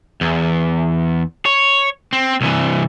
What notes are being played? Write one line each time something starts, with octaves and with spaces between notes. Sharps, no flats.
E2
C#5
C4
C2 E3